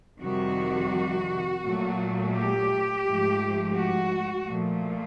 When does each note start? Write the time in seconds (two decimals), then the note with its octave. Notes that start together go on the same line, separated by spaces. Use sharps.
0.22 F2 C3 D#3 G3 F#4
1.64 A#2 F#3 A3
2.34 G4
3.06 G#2 F3 A3
3.76 F#4
4.46 A#2 F3 A3